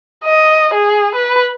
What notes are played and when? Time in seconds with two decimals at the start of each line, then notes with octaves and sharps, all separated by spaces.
0.25 D#5
0.74 G#4
1.15 B4